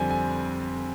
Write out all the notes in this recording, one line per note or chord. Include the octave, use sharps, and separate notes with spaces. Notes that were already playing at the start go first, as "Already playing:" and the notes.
Already playing: F2 D3 G3 C4 G#5
G#5